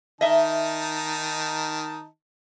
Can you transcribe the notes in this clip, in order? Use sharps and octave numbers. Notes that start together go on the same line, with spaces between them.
D#3 D#4 D#5 E5 A5